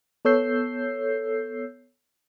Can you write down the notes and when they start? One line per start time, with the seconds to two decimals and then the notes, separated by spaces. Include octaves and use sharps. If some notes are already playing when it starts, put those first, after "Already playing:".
0.25 B3 A4 C#5 E6 G6 C7